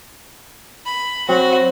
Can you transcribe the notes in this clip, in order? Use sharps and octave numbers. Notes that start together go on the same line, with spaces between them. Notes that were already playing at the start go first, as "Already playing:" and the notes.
B5
F#3 C4 F#4